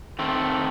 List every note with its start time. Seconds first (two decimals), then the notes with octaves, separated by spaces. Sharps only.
0.19 D#3 A3 C4